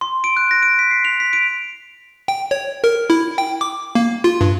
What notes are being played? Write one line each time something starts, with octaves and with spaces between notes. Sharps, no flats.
C6
D7
F#6
A#6
D7
B6
C7
F7
B6
D7
G5
C#5
A#4
E4
G5
D6
A#3
F4
G2